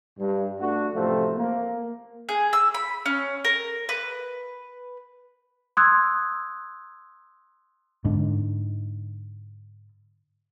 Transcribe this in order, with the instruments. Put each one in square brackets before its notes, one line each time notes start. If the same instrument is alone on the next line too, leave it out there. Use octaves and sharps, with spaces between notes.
[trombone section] G2
A3 D4 F#4
A1 C3 F3 A3 C4
A#3
[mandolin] G#4
E6
B5
C#4
A#4
B4
[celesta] C6 D#6 E6 F#6 G#6
[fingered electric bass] G#2 D3